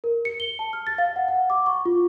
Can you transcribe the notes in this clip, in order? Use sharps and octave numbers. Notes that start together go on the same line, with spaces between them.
A#4
C#7
G7
A5
F6
A6
F5
F#5
F#5
D6
C#6
F4